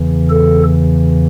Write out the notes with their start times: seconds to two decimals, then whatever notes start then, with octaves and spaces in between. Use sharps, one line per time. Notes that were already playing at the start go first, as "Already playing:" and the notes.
Already playing: E2 C#3 E3
0.30 A4